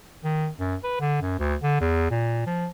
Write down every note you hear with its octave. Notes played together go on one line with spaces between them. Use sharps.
D#3
F#2
B4
D3
F#2
D2
D3
E2
A#2
F3